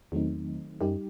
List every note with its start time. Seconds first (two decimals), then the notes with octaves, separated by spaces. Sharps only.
0.12 E2 D#3 F#3 A3 C4 D#4
0.81 F#2 G3 D#4 G4